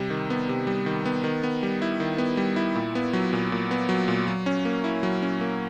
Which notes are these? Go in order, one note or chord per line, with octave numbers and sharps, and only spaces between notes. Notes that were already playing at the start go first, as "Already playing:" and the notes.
Already playing: C3 G3
D#3
B3
C3
G3
D#3
B3
D#3
B3
G3
E4
D#3
B3
G3
E4
A#2
B3
F#3
A#2
A#2
B3
F#3
A#2
F#3
C#4
A#3
E4
F#3
C#4
A#3